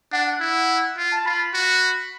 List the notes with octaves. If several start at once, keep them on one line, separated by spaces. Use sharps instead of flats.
D4 F#5
F#5
E4
F4
A5
F4 B5
F#4